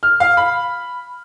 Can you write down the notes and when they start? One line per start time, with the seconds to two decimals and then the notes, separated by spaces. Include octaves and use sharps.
0.03 F6
0.20 F5
0.37 B5